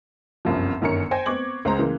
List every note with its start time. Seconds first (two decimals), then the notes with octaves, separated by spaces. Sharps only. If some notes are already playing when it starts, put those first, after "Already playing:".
0.45 G1 C2 F#2 C3 F3
0.81 G1 F#2 D#3 C#4 A#4 C#7
1.11 C5 G5 G#5 G#6 A#6
1.26 B3 C4 C#6 D6 G#6 F#7
1.65 C#2 G#3 C5 A#5
1.79 C#3 E3 A#3